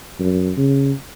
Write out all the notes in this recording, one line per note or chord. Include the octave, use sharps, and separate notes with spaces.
F#2
C#3